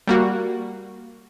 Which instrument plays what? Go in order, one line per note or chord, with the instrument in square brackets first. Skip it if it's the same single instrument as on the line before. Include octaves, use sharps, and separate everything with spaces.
[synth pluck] G3 A#3 F#4